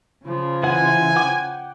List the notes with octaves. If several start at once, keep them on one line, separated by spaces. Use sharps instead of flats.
C#3 F3
E3 F#5 G#5
F#5 G5 D6